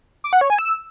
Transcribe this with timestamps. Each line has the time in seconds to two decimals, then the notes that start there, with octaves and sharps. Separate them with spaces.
0.24 D6
0.33 F#5
0.41 C#5
0.50 G#5
0.59 E6